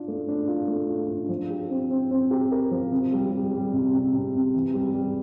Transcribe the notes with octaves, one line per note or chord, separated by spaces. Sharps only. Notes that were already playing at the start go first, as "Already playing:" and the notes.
Already playing: D4 F4
A3
D4
F4
A3
F4
D4
F3
G4
C4
C4
C4
G4
A#4
F3
C3
G3
G3
G3
C3
C3
C3
C3
E3
G3
G3